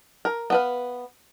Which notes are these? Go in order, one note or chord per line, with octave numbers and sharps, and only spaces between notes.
A#4
B3 B4 F5